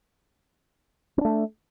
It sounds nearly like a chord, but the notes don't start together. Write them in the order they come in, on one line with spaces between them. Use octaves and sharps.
C4 D4 A3